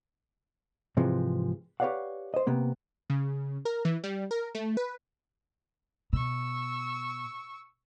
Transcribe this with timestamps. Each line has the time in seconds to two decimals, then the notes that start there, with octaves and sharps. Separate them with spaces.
0.97 G#2 C3 E3 F3 G#3
1.80 G4 B4 C#5 D5 F5 F#5
2.34 C5 D#5
2.47 C3 A#3 B3
3.10 C#3
3.65 A#4
3.85 E3
4.04 G3
4.31 A#4
4.55 A3
4.77 B4
6.13 B2 C#6 E6